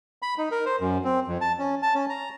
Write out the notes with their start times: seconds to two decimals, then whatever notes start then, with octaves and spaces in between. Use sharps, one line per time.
0.22 B5
0.38 D#4
0.51 A#4
0.66 C5
0.80 F#2
1.04 C4
1.27 F2
1.41 A5
1.59 C#4
1.82 A5
1.95 C#4
2.10 A#5